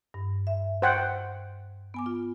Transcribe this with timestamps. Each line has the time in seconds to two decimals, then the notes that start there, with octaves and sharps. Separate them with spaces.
0.14 G2
0.47 E5
0.82 C5 F#5 G5
1.94 B3 G#5 D6
2.06 F4